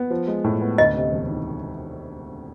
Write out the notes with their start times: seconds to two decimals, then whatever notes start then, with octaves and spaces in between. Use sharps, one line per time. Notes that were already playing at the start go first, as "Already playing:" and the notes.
Already playing: B3
0.10 F3
0.27 G#3
0.44 A2
0.61 B3
0.78 D2 D#5
0.95 C3
1.13 E1
1.28 D#3